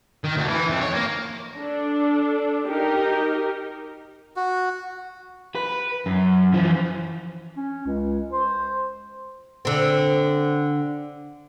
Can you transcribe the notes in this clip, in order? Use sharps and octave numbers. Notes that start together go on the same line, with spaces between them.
D#3
D2
E3
F2
C#5
A#3
D4 A4
D#4 G4 A#4
F#4
B4
F#2
E3 F3
C#4
C#2
C5
D3 C4